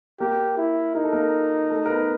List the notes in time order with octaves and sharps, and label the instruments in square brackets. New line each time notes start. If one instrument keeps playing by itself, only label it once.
[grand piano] A#3 A#4 [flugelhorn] G4
[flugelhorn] E4
[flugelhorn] D#4 [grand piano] A#4
[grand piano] A4
A#3 A#4
A3 A4
A#4
B3 B4